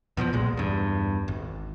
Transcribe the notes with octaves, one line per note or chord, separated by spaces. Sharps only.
E2 B2 D#3 F3
B1 A#2 G#3
E2 G2
G#1